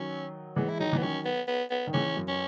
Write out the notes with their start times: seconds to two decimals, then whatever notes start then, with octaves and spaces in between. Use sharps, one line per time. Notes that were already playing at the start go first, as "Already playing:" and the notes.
Already playing: D#3 F#3 C#4
0.56 E3 G#3 B3
0.69 E4
0.79 D#3 F#3 D#4
0.93 E3
0.98 B3
1.02 D#3 F#3 C#4
1.25 B3
1.48 B3
1.71 B3
1.87 D#3
1.93 C#3 E3 C#4
2.17 F#2
2.28 C#4